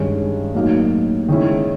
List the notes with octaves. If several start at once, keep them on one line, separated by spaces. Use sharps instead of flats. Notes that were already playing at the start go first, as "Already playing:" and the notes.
Already playing: G2 D#3 G#3 C#4
A2 F#3 A#3 D#4
D#3 G#3 C#4 E4